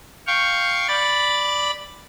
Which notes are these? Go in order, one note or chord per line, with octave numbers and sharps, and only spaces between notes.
F5 G5 C#6
D5 B5 A6